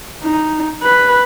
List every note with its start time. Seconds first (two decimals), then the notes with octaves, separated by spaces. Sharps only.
0.24 D#4
0.83 B4